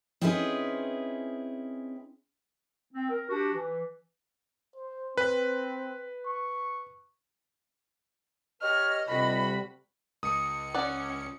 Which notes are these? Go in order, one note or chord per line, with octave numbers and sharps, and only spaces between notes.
C4 C#4 D#4 E4 G#4 B4
C4
A#4
D4 F#4 G4
E3
C5
C4 B4
C#6
G4 B4 C#5 D#5 F6
D2 C3 G3 F4 F#4 B5
C#2 D#6 C#7
C#4 D5 F#5